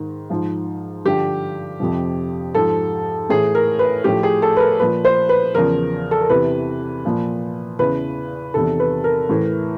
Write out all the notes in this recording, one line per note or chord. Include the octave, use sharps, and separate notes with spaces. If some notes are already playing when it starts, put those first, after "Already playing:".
Already playing: G#2 D#3
G#2 F3
G2 D3 F3 G4
F2 C3 F3
G#2 F3 A4
A2 E3 G#4
A#4
B4
A2 F3 G4
G#4
A4
B4
A#4
A#2 F3 B4
C5
B4
E2 C#3 F3 A#4
A4
A#4
E2 C3 E3 B4
A#2 F3
E2 C#3 E3 B4
E2 C3 D#3 A4
B4
A#4
A2 E3